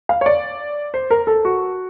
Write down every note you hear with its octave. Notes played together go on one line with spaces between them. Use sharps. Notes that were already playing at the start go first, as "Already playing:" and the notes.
F5
C#5
D5
C5
A#4
A4
F#4